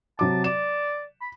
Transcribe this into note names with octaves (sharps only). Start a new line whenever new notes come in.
C3 F#3 A5 D6
D5 E7
B5